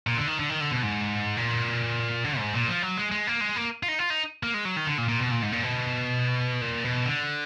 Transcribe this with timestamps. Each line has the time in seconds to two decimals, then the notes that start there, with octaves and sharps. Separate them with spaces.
0.07 A#2
0.17 D3
0.27 D#3
0.39 D3
0.50 D#3
0.61 D3
0.72 B2
0.83 G#2
1.37 A#2
2.24 D3
2.39 G#2
2.54 A#2
2.68 F3
2.82 F#3
2.97 G#3
3.12 G#3
3.27 A#3
3.41 G#3
3.56 A#3
3.83 F4
3.88 D#4
3.99 F4
4.10 D#4
4.43 A#3
4.54 G#3
4.65 F#3
4.77 D#3
4.87 D3
4.98 A#2
5.09 A#2
5.20 B2
5.31 A#2
5.42 G#2
5.52 A#2
5.63 B2
6.61 A#2
6.84 B2
7.06 D3